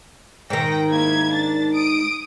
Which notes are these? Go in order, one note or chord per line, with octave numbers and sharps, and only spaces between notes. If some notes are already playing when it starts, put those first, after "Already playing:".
G#2 D#3 G5 A#6
A#3 E4 G#6
D4 A6
D#6 D7